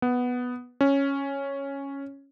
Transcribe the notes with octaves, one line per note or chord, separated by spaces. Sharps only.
B3
C#4